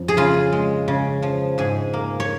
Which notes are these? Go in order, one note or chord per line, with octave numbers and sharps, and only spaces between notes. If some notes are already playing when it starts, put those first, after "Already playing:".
Already playing: F2
G#4
C#3 F4
G#3
C#3
F3
G#2 G#4
A#3
C#5